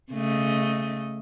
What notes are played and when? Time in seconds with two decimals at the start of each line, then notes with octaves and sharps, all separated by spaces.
0.13 C#3 A3 D#5